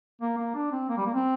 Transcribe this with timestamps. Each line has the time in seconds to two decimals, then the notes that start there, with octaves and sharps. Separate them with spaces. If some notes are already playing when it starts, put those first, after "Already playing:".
0.21 A#3
0.38 A#3
0.55 D4
0.72 C4
0.89 A#3
0.97 G3
1.06 A#3
1.14 C4